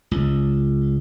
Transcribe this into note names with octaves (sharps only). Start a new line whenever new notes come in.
C#2